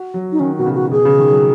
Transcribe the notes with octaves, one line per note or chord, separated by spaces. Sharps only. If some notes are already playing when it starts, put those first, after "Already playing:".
Already playing: F#4
F#3
D#4
D#3 C#4
B2 F#4
C#3
F#4
B2 G#4
C#3
D#3
F#3